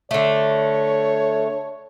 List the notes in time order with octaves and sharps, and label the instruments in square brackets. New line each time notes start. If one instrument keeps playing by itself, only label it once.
[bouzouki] D3 A3 [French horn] C#5